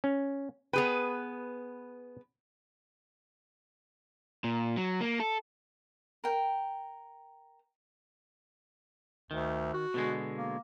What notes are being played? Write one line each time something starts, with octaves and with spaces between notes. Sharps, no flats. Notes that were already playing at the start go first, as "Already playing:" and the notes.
C#4
B3 G#4 B4 G5
A#2
F#3
A#3
A4
A#4 G5
D2 D#3
F#4
B2 D3 G#3
A#3